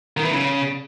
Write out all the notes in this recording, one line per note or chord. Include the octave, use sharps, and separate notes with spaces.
D#3
E3
C#3